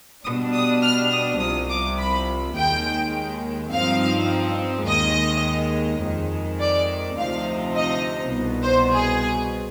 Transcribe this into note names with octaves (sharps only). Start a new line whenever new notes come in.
B2 G3 D4 D#6
D#6
F6
D#6
C2 C3 F3 D#6
D6
B5
D#2 D#3 G#3 G5
G2 F3 C4 D#4 F5
D#2 D#3 G#3 D#5
F2 D#3 G#3
D5
D2 C3 F3 C4 D#4 F5
D#5
C2 B2 B3
C5
G#4